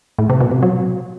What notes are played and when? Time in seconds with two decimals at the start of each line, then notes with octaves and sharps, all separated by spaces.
0.19 A2
0.30 C3
0.41 B2
0.51 C3
0.62 F#3